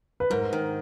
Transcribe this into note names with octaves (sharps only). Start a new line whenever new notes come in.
B4
G#2 A#4
D#3